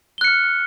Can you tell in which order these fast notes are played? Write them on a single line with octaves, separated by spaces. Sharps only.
G7 F#6 C#7 F6